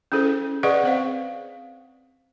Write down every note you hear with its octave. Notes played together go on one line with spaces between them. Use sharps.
C#4 E4 G#4 A4 C5
G#4 B4 D5 D#5 F#5 C#6
C4 C5 F5